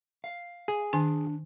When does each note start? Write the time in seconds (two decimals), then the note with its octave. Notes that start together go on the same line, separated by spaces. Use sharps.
0.24 F5
0.68 G#4
0.93 D#3 D4 G#5